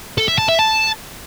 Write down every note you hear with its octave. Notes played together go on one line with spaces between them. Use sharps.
A4
E5
A5
E5
A5